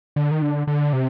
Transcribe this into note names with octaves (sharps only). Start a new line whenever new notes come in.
D3
D#3
D3
D3
C3